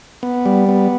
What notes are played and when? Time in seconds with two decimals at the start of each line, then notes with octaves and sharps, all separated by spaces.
0.23 B3
0.46 G3
0.69 B3